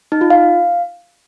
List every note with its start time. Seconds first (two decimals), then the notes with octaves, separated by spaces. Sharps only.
0.12 D#4
0.21 F4
0.30 F5